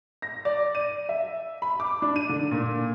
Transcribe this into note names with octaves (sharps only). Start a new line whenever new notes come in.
A#6
D5
D#7
E5
B5
D6
D4
D#7
D3
A#2